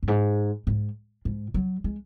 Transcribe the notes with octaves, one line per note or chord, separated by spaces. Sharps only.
F#2
G#2
G#2
G#2
F#3
G#3